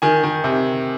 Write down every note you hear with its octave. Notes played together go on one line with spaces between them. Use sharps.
D#3 G#5
D#3
C3